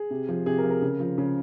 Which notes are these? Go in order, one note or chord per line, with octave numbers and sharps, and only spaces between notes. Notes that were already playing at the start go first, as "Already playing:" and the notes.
Already playing: G#4
C3
F3
C3 G#4
A#4
F3
A#4
C#3
F3
C#3